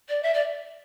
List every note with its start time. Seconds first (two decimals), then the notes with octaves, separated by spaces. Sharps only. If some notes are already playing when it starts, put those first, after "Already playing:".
0.08 D5
0.22 E5
0.33 D5